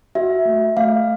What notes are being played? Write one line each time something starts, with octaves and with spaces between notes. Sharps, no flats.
F#4 E5
A3
A3 F5